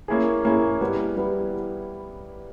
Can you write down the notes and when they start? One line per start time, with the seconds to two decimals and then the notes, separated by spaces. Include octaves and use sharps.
0.08 A#3 C#4 E4 G#4
0.45 A#3 C#4 E4 G#4
0.81 G3 B3 E4
1.17 G3 B3 E4